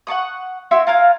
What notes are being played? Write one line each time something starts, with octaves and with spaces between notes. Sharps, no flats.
F#5 A5 C#6 D#6
E4 F#4 E5 C6
F4 A#4 F5 G#5